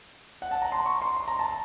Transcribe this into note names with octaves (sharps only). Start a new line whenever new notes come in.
F#5
A5
A#5
C6
C#6
C6
C6
A#5
A5